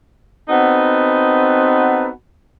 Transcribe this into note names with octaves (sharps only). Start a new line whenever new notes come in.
B3 C4 D#4 F#4 A4 B4